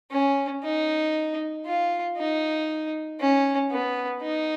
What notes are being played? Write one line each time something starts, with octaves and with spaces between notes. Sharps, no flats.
C#4
D#4
F4
D#4
C#4
B3
D#4